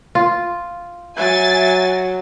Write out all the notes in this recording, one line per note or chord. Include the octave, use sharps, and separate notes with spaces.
F4
F#3 E5 G#5 A6